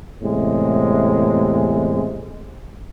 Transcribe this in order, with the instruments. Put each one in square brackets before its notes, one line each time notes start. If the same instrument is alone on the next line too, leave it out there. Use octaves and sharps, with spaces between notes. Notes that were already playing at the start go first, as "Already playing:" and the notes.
[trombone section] E2 A2 C3 G#3